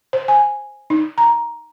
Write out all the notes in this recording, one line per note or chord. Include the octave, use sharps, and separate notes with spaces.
C5
G#5
D#4
A#5